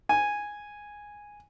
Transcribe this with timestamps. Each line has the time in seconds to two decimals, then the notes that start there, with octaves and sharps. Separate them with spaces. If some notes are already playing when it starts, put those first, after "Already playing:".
0.09 G#5